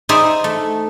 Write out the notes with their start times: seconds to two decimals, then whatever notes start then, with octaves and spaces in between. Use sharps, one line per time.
0.09 D#4 G#4 C5 D5 E5
0.44 A3